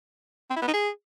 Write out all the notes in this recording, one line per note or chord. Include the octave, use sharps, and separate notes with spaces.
C4
E4
B3
D#4
G#4